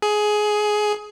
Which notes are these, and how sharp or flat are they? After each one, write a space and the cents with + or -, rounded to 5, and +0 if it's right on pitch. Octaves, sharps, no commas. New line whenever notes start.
G#4 +15